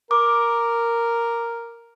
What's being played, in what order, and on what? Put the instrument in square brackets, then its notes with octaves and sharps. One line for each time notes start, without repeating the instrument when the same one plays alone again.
[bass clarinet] A#4 [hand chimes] D6